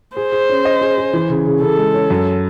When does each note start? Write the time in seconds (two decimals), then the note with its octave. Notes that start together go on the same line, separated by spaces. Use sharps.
0.17 G#4 C5
0.32 G#4
0.49 C#4
0.65 D#5
0.81 G#4
0.98 G#4
1.13 E3
1.29 C#3
1.46 C#3
1.62 C#3 A4
1.77 G#3
1.94 C#4
2.10 F#2